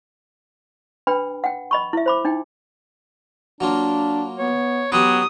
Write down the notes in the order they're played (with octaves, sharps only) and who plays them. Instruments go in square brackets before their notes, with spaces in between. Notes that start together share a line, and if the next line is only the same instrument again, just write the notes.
[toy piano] D4 B4 G5 B5
F#5 G5
D#5 B5 C#6
E4 E5
C5 B5 D6
D4 D#4 G5
[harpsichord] F#3 A#3 F4 [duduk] D4
[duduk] B3 [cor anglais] C#5
[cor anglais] F#3 [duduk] B3 [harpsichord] G4 B4 [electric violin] D#6